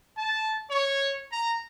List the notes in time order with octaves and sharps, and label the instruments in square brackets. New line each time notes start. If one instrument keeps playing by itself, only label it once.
[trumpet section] A5
C#5
A#5